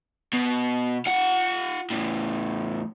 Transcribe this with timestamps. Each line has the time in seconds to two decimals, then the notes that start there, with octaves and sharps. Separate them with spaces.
0.33 B2
1.06 F4 F#5
1.91 E2 A2